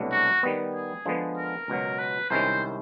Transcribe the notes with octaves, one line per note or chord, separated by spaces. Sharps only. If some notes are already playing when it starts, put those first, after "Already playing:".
Already playing: C2 B2 F#3 A3 D4
F#4
D#3 G3 B3
G#4
D3 F3 G#3 B3
A#4
C#2 B2 F#3
B4
C2 C3 D#3 G#3 C#4 C5